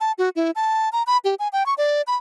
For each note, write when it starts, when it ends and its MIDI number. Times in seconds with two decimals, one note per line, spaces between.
0.01 0.12 81
0.18 0.29 66
0.36 0.51 64
0.56 0.89 81
0.93 1.03 82
1.07 1.18 83
1.25 1.35 67
1.39 1.48 80
1.53 1.66 79
1.66 1.74 85
1.78 2.02 74
2.07 2.16 83